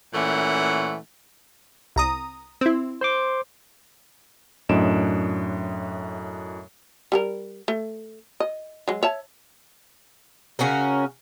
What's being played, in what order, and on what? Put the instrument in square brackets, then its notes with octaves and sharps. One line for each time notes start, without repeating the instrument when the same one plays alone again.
[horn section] A#2 E3 A3 C#4 F#5
[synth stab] C2 A#5 D#6
C4 E4
[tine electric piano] C5 C6 D6
[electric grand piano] F#2 A2 D4 D#5 D7 E7
[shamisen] G3 G#4 A#4
A3
D#5
F#3 G#3
C#5 E5 A5
[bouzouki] C#3 C#4 F#4 A#4